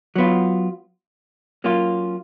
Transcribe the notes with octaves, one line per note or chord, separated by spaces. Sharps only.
F#3 B3 F4
F#3 A#3 C#4 F4